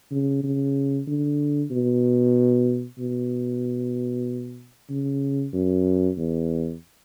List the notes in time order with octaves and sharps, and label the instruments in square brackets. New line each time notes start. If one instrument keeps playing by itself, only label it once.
[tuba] C#3
C#3
D3
B2
B2
C#3
F#2
E2